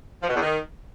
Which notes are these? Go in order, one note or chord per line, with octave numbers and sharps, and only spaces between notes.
F3
B2
E2
D#3